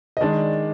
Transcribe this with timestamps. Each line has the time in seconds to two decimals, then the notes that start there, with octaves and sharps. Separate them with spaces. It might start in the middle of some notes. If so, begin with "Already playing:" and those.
0.17 D#5
0.21 D#3 G#3 D4 D5